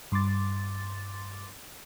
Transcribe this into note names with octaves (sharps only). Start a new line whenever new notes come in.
G2 C6 D6 A6